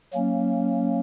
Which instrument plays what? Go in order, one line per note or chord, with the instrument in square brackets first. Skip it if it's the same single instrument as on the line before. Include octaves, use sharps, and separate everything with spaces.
[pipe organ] F#3 A#3 C#4